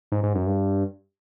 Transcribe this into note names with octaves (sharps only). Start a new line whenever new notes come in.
G#2
G#2
F#2
G2